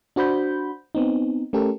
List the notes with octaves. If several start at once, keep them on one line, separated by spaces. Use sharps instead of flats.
D4 F#4 C5 B5 G6
B3 C4 D#4
A3 C#4 G4 A4 A#4